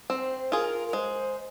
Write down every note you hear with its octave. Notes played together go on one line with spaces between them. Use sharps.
C4 C5
F4 G#4 A#4
A#4
G#3 C5